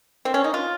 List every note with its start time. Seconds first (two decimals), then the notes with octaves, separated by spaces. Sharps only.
0.25 C4
0.34 C#4
0.44 D#4
0.54 F4